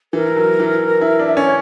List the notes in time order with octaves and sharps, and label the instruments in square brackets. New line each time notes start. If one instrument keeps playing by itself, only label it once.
[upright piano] E3 [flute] A#4
[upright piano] F#3
E3
E4
D4
[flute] E5
[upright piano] C#4 [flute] D5
[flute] C#5